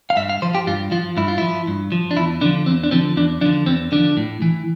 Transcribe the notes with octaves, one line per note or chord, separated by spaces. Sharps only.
F5
G2 E5
F5
F3 C5
G4
G2 F4
F3 F4
G2 E4
F4
F3 E4
G2
F3
D4
E2 E4
D3 F3 D4
E2 C4
D4
D3 F3 C4
E2 D4
D3 F3 D4
E2 C4
D3 F3 D4
A2
E3